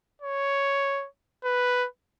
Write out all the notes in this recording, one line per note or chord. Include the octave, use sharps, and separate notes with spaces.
C#5
B4